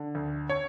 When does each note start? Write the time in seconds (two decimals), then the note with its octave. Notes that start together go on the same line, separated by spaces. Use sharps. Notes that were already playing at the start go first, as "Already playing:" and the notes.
Already playing: D3
0.15 D2
0.50 C#5